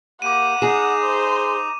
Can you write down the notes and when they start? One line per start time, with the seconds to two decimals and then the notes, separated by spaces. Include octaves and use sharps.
0.22 A#3 G4 F#5 D6 D#7
0.62 D#4 G#4 A#5 E7
1.03 C5